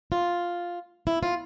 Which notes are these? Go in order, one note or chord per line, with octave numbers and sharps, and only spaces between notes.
F4
E4
F4